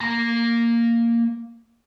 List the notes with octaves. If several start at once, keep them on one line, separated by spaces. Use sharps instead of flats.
A#3 A#5